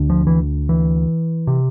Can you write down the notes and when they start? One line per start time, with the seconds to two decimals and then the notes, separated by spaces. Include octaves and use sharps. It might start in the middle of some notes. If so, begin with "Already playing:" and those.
Already playing: D2 D3
0.10 F3
0.27 E3
0.69 E3
1.47 C3